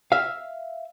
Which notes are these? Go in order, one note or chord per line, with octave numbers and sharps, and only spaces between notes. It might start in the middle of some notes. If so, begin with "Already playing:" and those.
E5 F5